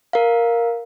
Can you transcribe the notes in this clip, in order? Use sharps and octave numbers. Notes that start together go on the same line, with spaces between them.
A#4 F5